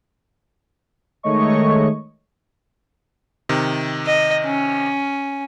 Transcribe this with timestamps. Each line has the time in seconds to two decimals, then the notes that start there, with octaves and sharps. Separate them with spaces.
1.23 D#3 G#3 A3 C#5 D#5 C#6
3.49 C3 D#3
4.06 D#5
4.44 C#4